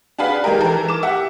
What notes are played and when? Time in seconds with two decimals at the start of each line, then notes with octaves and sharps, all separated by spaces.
0.18 D4 F#4 G#4 B4 F5 B5
0.44 D#3 G#3 G4 A#4
0.60 E3 A4 A#4
0.88 D6 E7
1.03 G4 E5 F#5